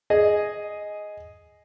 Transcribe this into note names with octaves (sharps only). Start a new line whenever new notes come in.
G#4 D#5